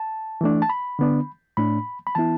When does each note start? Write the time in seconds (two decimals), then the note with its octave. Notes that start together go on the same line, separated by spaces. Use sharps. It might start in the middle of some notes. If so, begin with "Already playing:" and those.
Already playing: A5
0.41 E3 A3 D4
0.62 A5
0.70 B5
0.99 D3 B3 D4
1.57 A2 A3 D4 B5
2.07 B5
2.15 E3 B3 E4 A5